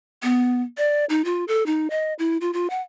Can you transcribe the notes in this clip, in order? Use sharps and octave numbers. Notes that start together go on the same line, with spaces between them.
B3
D5
D#4
F4
A4
D#4
D#5
E4
F4
F4
F#5